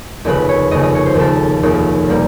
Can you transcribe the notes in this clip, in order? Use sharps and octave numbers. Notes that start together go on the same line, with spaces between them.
F1 D#2 C#3 B4
C#5
F1 D#2 C#3 D#5
D#5
C#5
C5
F1 D#2 C#3 A4
F1 D#2 C#3
B2 G3 A#3